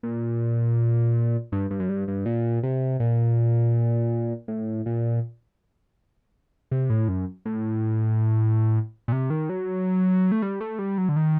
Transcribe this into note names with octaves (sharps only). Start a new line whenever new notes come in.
A#2
G2
G2
F#2
G2
G2
A#2
C3
A#2
A2
A#2
C3
A2
F#2
A2
A#2
C3
D#3
F#3
A3
G3
A3
G3
F#3
D3
D#3